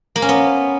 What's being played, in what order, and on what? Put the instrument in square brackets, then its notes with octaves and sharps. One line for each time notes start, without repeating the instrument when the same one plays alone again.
[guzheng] A#3
C#4
B3